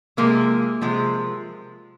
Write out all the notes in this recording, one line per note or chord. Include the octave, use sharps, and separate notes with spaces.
C3 F3 G#3 A#3
C3 F3 G#3